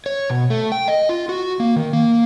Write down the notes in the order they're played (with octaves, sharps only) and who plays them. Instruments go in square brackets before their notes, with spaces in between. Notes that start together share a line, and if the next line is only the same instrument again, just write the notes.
[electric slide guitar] C#5
B2
A3
G5
D#5
F4
F#4
A#3
D#3
A#3